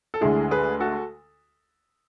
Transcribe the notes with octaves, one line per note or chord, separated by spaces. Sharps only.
A4
D2 D3 G#3 E4 G#4
G#4 B4
F#4 A4